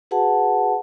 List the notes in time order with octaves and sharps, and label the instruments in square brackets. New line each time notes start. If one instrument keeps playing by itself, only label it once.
[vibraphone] F#4 G#4 B4 F#5 A5